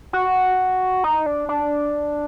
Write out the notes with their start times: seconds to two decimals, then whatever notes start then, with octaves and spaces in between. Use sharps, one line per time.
0.13 F#4
1.04 D#4
1.26 D4
1.49 D4